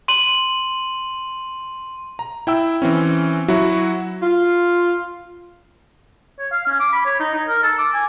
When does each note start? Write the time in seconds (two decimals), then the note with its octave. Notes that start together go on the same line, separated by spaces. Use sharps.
0.08 C6 D#7 F#7
2.19 A#5
2.47 E4 G5 E6
2.82 E3 C4 C#4
3.48 F#3 E4 F#4
4.22 F4
6.39 C#5
6.52 F5
6.67 C#4
6.80 D6
6.93 B5
7.05 C#5
7.20 D#4
7.34 D#4
7.48 A#4
7.63 A4
7.78 D6
7.94 G#5